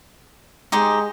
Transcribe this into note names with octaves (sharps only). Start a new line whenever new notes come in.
G#3 D#4 G4 C5